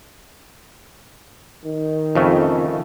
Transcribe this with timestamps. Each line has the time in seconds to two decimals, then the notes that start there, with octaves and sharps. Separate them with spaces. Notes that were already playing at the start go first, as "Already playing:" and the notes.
1.65 D#3
2.15 F2 C#3 A3